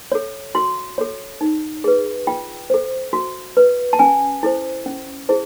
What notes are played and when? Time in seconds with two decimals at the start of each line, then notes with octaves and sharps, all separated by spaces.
0.12 A4 C#5
0.55 F#4 C6
0.98 A4 C#5
1.41 D#4
1.84 G#4 B4
2.27 F4 G5
2.70 A4 C5
3.13 F#4
3.57 B4
3.93 A5
3.99 C#4 G#5
4.43 E4 A4 C5
4.86 C#4
5.29 E4 G#4 C5